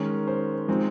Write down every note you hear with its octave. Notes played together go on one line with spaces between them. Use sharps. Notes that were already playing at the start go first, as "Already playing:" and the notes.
Already playing: D#3 G#3 C#4 A#4
C5
F3 G#3 C4 D#4